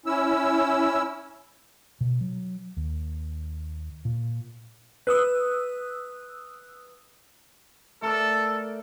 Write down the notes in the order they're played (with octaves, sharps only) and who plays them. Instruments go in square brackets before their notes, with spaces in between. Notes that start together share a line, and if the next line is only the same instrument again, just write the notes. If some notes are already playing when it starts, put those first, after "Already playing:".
[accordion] C#4 E4 E6
[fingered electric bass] B2
F#3
D#2
A#2
[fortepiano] B4 [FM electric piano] D#6 E6 F#6
[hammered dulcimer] A3 A#4 D5 [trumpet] A4